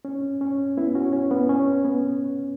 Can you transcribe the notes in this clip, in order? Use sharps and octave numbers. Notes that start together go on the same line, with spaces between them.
C#4
C#4
B3 E4
C#4 F#4
C#4
B3
C#4
B3